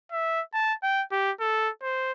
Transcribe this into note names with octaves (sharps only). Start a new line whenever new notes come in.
E5
A5
G5
G4
A4
C5